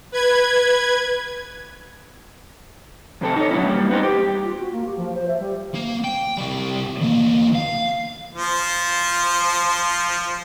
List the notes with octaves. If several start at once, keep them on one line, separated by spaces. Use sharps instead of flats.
B4 G#6
F2 C3 C4 A4
D#4 C#5
A#2 F#3 C#4 E4
G3 A#3
B3 C4 D#4 C5
G4
F4
F#4
A#3
G4
F3
C5
E5
G3
A#3
G5
C3 G3
E2 A#3
F5
F3 C5